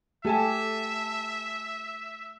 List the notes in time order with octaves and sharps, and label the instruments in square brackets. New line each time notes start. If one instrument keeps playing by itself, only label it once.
[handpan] A3 G4 [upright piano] A4 G#5 A5 [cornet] E5